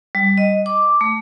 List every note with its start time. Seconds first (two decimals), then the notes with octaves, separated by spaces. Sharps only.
0.15 G3
0.37 D#5
0.66 D6
1.01 A3